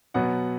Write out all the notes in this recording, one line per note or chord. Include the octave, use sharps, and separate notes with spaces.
B2 F#3 B3 F#5